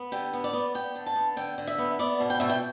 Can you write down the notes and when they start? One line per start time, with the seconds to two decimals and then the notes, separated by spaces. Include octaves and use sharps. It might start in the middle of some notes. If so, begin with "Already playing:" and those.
Already playing: B3
0.12 D3 G4
0.33 B3
0.44 D5
0.53 B3
0.75 B3 G5
0.95 D3
1.06 A5
1.16 B3
1.36 D3 G5
1.58 D3
1.67 E5
1.78 B3
1.99 B3 D5
2.20 B2
2.30 G5
2.40 B2 E5
2.49 G5